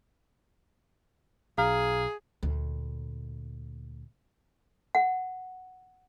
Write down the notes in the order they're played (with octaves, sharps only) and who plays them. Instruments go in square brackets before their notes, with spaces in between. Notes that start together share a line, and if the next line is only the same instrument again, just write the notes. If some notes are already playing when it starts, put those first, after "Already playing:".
[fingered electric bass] B1 [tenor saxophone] G#4 [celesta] F5 A#5 F6
[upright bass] D2 A#2
[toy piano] F#5